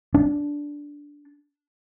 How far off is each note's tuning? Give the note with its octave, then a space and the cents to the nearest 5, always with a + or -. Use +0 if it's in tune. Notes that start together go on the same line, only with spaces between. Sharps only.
D4 -10